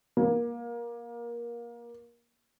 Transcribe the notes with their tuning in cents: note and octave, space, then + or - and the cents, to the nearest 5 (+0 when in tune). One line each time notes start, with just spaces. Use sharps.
A#3 +20